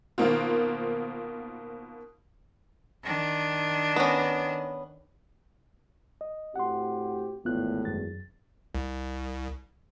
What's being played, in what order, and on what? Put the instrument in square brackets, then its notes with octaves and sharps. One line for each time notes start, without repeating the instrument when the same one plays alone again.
[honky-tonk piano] B2 D#3 A#3 C4 F4
[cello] D#3 D4
[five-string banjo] B3 C#4
[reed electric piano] D#5
[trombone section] A2 C4 F#4 [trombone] G4 [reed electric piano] F#5 C6
[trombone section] G#1 E2 [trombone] A2 [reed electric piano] B3 F4 F#6
[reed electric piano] F#2 A6
[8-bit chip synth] C2